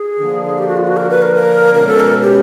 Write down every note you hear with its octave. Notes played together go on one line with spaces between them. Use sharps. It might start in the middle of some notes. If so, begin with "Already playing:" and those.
Already playing: G#4
D3 F3 A#3
G4
F#4
F4
F#4
A#4
B4
A#4
A#4
B2 G#3 C#4 A#4
A4
A#4
G4